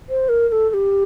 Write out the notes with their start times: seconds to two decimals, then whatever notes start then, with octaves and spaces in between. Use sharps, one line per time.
0.09 C5
0.29 A#4
0.49 A#4
0.52 A4
0.70 A4
0.74 G4